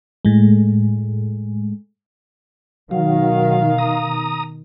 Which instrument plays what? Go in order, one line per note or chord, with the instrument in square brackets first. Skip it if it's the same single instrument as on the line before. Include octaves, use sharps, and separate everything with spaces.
[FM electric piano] A2 G#3
[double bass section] B2 D#3 [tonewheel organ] F#3 [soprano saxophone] F5
[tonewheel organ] A#5 D#6